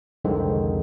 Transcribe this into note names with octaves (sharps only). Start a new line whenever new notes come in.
C2 F2 D3 D#3 G#3 C4